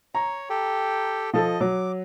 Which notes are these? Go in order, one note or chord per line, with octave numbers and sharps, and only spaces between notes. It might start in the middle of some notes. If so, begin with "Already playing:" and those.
C#5 A#5
G4 A4 G5
F3 A4 D#5
F#3 D6